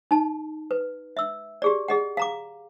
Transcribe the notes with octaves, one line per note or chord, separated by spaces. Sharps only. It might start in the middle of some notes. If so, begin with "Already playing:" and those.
D#4 A5
B4
E5 E6
G4 G#4 D5
G#4 D#5 F#5
F5 A#5 D6